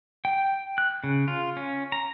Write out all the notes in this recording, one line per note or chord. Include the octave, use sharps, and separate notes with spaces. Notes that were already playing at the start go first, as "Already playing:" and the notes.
G5
F#6
C#3
F4
C#4
A#5